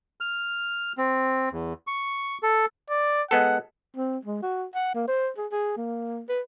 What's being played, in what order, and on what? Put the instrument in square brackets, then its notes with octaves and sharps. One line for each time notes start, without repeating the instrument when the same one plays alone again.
[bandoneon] F6
C4
E2
C#6
A4
[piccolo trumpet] D5
[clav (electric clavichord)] G#3 B3 A4 [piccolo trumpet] F#5
[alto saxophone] C4
G#3
F#4
F#5
A#3
C5
G#4
G#4
A#3
B4